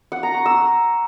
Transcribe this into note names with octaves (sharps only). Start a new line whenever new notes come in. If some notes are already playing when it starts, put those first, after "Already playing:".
F#5
A#5
C#6
E6